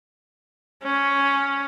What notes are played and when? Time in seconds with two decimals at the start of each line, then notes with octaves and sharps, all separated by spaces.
0.83 C#4